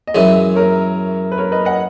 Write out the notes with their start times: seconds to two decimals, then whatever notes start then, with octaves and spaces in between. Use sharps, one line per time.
0.07 D#5
0.14 F#2 E3 G#3 C#5 E5
0.56 A#4 C#5
1.32 B4
1.38 A#4 C#5
1.52 B4 D#5
1.65 D#5 F#5